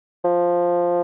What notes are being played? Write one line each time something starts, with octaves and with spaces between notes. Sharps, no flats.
F3